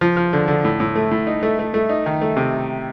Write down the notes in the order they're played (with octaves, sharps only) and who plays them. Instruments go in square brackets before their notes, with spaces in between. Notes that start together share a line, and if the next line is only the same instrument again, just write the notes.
[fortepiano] F3
F3
D3
D3
A2
A2
A3
A2
D#4
A3
A3
A3
D#4
D#3
A3
C3